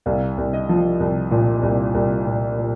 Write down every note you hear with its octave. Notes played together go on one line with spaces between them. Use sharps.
C2 F5
C2
D#5
F3
C2
A#2
C2
C2
A#2
A#2